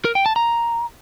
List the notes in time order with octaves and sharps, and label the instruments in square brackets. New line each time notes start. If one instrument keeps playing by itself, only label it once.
[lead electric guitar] A#4
G5
A5
A#5